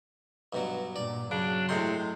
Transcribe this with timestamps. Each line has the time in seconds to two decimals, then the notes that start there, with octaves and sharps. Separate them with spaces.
0.53 G2 B2 F#3
0.96 G2 A#2 D5
1.31 C#3 F#3 D4
1.69 A2 C3 G#3 C6